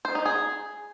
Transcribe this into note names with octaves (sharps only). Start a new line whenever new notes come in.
C5
D#4
G#4